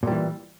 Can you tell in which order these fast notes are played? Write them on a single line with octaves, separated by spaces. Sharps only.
A#2 G3 E3